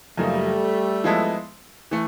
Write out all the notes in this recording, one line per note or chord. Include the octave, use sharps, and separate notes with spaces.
F#2 C#3 F3 G3 A3 A#3 D#4
F3 G#3 B3 E4 A4
E3 A3